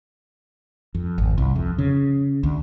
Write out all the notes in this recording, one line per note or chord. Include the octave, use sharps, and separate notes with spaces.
F2
G#1
C2
F2
C#3
D2